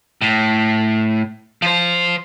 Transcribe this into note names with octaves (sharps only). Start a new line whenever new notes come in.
A2
F3 C5